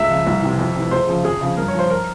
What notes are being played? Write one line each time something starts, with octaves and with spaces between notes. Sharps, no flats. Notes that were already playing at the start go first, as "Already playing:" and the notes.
Already playing: C#2 E5
C#3 F3
C2
C3 E3
F2
C3 E3
C#2 C5
C#3 F3
F2 G#4
C#3 F3
G2 A#4
C#5
F3 C5
A#4